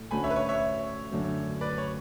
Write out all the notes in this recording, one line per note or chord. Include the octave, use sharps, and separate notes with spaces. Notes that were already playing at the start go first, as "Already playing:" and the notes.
Already playing: A2 E4
D2 D3 A3 C#4 F#4 G#5 B5
C#5 E5
B4
C#5
C#5 E5
F#2 D3 A3 D4
B4 D5
C#5